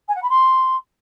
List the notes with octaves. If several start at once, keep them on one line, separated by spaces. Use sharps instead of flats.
G#5
F#5
B5
C6